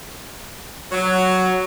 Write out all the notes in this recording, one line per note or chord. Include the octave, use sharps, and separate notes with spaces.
F#3